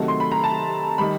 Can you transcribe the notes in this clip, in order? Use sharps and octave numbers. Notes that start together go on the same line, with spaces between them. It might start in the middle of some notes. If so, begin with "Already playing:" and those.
Already playing: C3 D#3 F#3 A3
C6
B5
A#5
A5
D#3 G3 B5